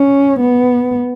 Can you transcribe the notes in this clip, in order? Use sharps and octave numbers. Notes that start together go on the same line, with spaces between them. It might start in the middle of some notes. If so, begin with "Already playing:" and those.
Already playing: C#4
B3